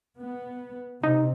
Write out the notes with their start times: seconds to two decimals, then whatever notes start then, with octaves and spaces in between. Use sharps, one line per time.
0.19 B3
1.03 C3 D#4